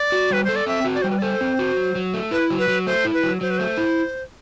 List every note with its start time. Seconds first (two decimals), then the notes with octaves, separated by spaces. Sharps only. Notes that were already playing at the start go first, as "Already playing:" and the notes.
Already playing: D5
0.12 F#4
0.31 G3 B4
0.44 A4 C5
0.56 D5
0.66 C4 E5
0.85 F#4
0.95 D5
1.02 G3 C5
1.11 B4
1.19 D5
1.22 A4 C5
1.41 C4
1.59 F#4
1.77 F#3
1.95 F#3
2.14 A3
2.31 E4 B4
2.50 F#3
2.59 B4
2.68 F#3
2.87 A3 C5
3.05 E4
3.14 B4
3.23 F#3
3.41 F#3 C5
3.50 B4
3.58 A3 C5
3.78 E4